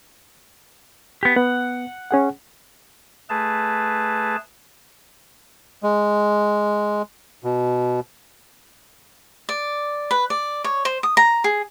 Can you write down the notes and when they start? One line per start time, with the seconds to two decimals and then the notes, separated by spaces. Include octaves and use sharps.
1.23 B3 G4
1.36 B3 F#5
2.11 C#4 G#4 F#5
3.30 A3 G#4 B4 A5
5.83 G#3
7.44 B2
9.49 D5
10.11 B4
10.30 D5
10.64 C#5
10.85 C5
11.03 D#6
11.17 A#5
11.44 G#4